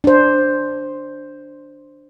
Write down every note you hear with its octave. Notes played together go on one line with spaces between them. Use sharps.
D4 C5